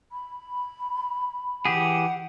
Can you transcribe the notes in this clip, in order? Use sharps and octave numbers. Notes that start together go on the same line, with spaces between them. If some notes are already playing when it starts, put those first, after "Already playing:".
B5
E3 G4 G#4 F#5